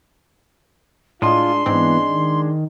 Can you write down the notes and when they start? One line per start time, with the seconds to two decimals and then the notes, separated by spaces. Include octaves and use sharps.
1.22 A2 G#3 D4 F4 D#5 C6
1.66 G#2 E3 G#3 B3 C4 D4
2.09 D#3